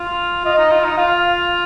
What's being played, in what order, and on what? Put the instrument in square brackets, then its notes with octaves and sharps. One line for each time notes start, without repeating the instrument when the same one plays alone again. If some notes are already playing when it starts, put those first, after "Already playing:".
Already playing: [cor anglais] F4
[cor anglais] F4 [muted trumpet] D#5
[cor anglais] D#4
F4
D#4
[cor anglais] F4 [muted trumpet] F5